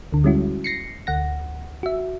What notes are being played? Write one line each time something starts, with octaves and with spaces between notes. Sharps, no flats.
D2 D3
G3 G#3 C#4 E4 F#4
A#6 C7 C#7
D2 F#5 A#6
F#4 E5